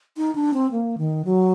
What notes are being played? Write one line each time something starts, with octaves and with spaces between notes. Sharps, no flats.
D#4
D4
C4
A#3
D#3
F#3